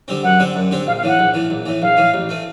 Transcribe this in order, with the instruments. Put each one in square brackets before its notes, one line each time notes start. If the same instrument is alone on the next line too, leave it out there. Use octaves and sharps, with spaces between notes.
[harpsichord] D3 G3 C4
[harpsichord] F#2 [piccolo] F#5
[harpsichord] D3 G3 C4
F#2
D3 G3 C4
[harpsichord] A#1 [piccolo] F5
[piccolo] F5
[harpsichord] A2 E3 [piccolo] F#5
[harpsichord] A#1
A2 E3
A#1
A2 E3
[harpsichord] A#1 [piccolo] F5
[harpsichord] A2 E3
A1
E3 A3